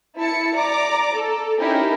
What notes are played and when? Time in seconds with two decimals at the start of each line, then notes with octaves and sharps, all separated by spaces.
0.17 E4 A5 C#7
0.56 D5 A#5 D6
1.15 A4
1.60 C#4 D#4 E4 G4 A#4